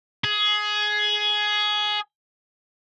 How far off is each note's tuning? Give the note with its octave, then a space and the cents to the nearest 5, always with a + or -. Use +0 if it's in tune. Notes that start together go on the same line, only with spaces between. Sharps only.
G#4 +15